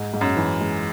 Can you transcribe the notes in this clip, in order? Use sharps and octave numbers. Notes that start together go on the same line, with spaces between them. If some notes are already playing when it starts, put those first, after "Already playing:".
Already playing: G#2
G#2
F#2
E3
G#3